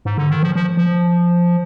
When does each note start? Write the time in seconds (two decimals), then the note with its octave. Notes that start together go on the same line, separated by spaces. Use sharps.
0.05 G#2
0.18 D3
0.30 D#3
0.43 F3
0.55 F3
0.77 F3